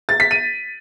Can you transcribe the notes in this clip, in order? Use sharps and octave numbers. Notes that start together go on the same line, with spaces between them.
A6
B6
D#7